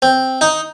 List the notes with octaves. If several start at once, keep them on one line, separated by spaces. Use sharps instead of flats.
C4
D#4